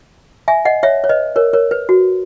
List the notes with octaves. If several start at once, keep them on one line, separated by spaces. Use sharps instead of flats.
E5 G#5
D#5 F#5
C#5 E5
C#5
B4 D#5
A#4 C#5
A#4 C#5
B4
F#4